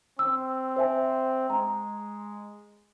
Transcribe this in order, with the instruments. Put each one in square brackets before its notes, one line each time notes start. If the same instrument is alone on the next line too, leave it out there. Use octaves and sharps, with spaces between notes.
[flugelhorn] C4 [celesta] E6
[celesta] C5 E5 G#5
[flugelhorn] G#3 [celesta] A#5